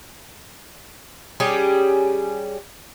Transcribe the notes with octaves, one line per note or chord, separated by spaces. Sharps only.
G3 C#4 G4 G#4